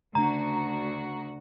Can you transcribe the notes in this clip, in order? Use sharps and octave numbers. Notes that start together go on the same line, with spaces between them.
D2 C#3 D4 F#4 A#5